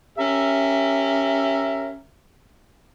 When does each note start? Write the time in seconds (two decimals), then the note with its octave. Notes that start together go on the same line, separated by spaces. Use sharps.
0.17 C#4 G4 A#4 E5